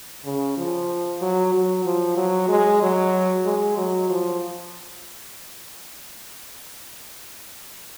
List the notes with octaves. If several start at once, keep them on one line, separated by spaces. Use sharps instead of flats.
C#3
F3
F#3
F#3
F3
F#3
G#3
F#3
G#3
F#3
F3